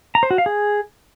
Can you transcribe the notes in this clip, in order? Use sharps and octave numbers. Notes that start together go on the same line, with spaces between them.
A#5
C5
F#4
F5
G#4